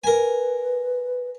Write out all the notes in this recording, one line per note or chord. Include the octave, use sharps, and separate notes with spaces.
A#4 B4 G#5